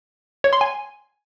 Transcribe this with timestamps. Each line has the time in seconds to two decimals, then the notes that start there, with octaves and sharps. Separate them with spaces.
0.44 C#5
0.53 C6
0.61 G#5